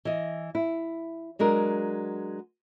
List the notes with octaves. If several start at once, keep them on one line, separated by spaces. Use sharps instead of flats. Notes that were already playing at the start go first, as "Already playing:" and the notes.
E3 D#5
E4
F#3 G#3 D4 A#4